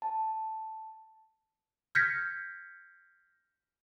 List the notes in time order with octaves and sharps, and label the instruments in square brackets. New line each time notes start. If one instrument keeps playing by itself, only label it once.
[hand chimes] A5
[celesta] F6 G6 G#6 A#6 B6 C#7